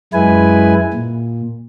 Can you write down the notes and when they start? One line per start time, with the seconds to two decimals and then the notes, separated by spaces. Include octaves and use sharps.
0.13 F#2 G#3 E4 B4 G#5
0.94 A#2